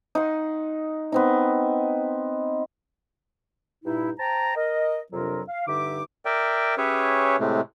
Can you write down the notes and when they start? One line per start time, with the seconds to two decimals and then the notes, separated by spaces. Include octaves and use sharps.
0.15 D#4 F#5 C6
1.12 B3 C4 D#4
3.85 G2 A#2 D#4 E4
4.19 C5 G5 A5 A#5
4.56 A#4 D#5
5.12 F2 C3 F#3 D4 F4 A#4
5.48 F5
5.67 G2 D3 D#4 E5 D6
6.25 A#4 D5 E5 G5
6.78 C#4 G4 G#4 B4 C#5 E5
7.39 A2 C3 G#3 A3